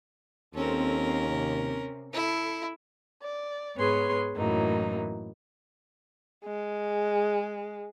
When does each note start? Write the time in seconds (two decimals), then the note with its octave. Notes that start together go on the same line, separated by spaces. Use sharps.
0.55 D#2 C4 C#4 A4 A#4
1.01 C4
1.31 C3
2.13 E4 A4
3.22 D5
3.76 G#2 B3 G#4 B4 C#5 C6
4.36 F#2 A2 E3 F#3 A#3 D#4
6.45 G#3